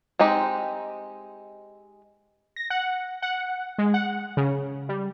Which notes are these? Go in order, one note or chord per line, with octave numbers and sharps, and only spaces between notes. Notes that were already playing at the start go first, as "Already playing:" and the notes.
G#3 C4 D#4 G4
A#6
F#5
F#5
G#3
F#5
C#3
G3